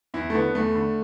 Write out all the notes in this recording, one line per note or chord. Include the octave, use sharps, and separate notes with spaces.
E2 E4
A3
D3 B3
E2 A3
D3